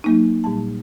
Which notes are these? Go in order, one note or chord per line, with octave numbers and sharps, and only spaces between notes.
F#3 A#3 D#4
A#2 G3 A5